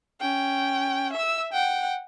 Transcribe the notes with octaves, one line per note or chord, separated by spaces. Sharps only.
C#4 G5
E5 E6
F#5 G5